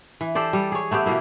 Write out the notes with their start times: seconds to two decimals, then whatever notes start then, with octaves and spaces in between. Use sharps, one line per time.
0.21 E3
0.35 G4 A4 C5 D5
0.53 G3
0.72 G#4 C#5
0.91 A3 B3 C4 G4
1.06 B2 E3 A#3 E4